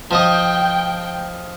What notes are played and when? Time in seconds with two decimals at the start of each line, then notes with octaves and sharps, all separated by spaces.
0.11 F3 D#5 G5 D#6